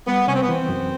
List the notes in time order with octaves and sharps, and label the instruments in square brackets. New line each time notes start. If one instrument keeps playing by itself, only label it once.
[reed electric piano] G3 [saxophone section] B3
[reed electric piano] C3 [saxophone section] C#4
[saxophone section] C4
B3
[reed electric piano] E3 [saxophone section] C4
[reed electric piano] F#2